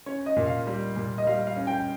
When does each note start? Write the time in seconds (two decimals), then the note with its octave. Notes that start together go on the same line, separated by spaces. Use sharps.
0.06 C#4 C#5
0.26 D#5
0.36 A#2
0.46 F5
0.67 G3
0.96 A#2
1.18 D#5
1.27 G3 F5
1.47 F5
1.57 C#4
1.67 G5